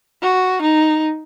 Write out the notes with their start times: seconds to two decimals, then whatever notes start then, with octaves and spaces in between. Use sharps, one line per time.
0.22 F#4
0.62 D#4